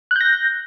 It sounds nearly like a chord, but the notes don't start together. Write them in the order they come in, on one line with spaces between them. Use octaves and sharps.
F#6 G6 A#6